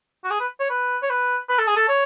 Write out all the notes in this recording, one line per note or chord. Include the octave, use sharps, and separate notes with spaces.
F#4
G#4
B4
C#5
B4
C#5
B4
B4
A4
G#4
A4
C#5